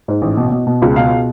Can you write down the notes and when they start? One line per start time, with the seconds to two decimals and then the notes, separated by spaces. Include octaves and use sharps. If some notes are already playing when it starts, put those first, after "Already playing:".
0.08 G#2
0.22 A1
0.37 B2
0.51 B2
0.67 B2
0.82 C#2
0.96 B2 F5